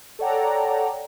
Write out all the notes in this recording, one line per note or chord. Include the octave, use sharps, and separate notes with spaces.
A4 C#5 D5 F#5 G5 A#5